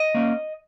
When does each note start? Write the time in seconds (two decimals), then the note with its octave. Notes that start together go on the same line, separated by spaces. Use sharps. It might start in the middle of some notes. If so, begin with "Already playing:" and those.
Already playing: D#5
0.14 A#3 C#4